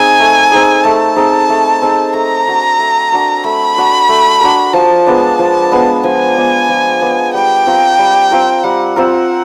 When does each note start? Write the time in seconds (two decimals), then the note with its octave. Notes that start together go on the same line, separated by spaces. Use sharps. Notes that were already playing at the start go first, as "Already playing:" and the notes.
Already playing: C4 D#4 G#4 G#5
0.20 A3
0.52 C4 D#4 G#4
0.84 A3 A5
1.16 C4 D#4 G#4
1.49 A3
1.82 C4 D#4 G#4
2.14 A3 A#5
2.47 D4 F#4 A#4
2.79 A3
3.12 D4 F#4 A#4
3.44 A3 B5
3.76 D4 F#4 A#4
4.09 A3
4.41 D4 F#4 A#4
4.73 F3 A5
5.07 G#3 B3 D4
5.39 F3
5.72 G#3 B3 D4
6.03 F3 G#5
6.36 G#3 B3 D4
6.69 F3
7.01 G#3 B3 D4
7.34 G3 G5
7.66 C4 F4 A#4
7.99 G3
8.31 C4 F4 A#4
8.63 G3 F#5
8.96 C4 F4 A#4